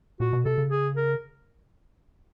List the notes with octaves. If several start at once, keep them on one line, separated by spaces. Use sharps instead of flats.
A#2 F#4
B2
C3 A4
C#3
G#4
A#4